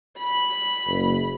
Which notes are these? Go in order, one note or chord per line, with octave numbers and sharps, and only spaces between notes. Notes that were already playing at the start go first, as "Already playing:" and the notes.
B5
F#1